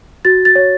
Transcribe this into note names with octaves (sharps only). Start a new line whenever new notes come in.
F#4 A6
A6
C#5